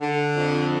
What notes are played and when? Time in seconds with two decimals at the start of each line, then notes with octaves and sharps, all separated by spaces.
0.01 D3
0.36 F2